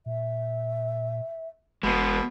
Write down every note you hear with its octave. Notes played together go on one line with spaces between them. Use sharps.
A#2 E5
F#1 B2 G#3 B3